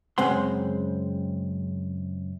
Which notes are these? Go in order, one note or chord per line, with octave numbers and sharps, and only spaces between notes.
F#2 C#3 G#3 C4 F#5 C6